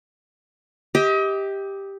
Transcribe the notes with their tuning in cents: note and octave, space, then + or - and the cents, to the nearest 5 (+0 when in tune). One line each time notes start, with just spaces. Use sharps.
G4 +5 D#5 +35